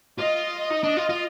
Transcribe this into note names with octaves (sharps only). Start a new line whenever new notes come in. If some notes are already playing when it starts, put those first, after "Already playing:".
F4 D#5
D#4
D4
F4
F4